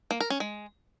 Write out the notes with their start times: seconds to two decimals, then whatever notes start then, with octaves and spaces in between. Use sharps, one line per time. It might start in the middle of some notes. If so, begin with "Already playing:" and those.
0.11 A#3
0.20 A#4
0.30 C#4
0.40 G#3